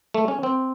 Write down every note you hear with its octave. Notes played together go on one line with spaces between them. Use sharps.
A3
C#4
C4